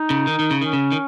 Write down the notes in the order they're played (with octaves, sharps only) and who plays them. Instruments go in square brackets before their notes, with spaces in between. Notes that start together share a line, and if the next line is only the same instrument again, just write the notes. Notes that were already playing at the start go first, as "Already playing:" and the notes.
Already playing: [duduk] D#4
[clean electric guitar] C#3
D#3
D#3
C#3
[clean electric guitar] D#3 [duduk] C#4
[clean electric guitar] C#3
D#3